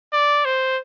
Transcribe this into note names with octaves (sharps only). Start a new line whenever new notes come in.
D5
C5